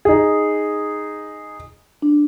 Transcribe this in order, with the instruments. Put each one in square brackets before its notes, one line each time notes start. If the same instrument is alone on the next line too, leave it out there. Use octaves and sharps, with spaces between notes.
[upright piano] D#4 G#4
[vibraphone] D4